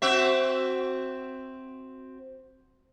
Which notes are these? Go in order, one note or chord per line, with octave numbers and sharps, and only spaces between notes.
C4 F#4 E5